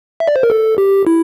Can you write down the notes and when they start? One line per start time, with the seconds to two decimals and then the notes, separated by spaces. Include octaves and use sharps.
0.20 E5
0.28 D5
0.36 C5
0.43 A#4
0.50 A4
0.78 G4
1.07 E4